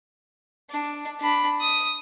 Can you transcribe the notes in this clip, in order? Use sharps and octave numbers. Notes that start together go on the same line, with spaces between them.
D4
D4 B5
D#6